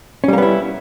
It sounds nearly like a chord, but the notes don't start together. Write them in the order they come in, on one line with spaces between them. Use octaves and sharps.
C#4 G3 A#3 B3 E4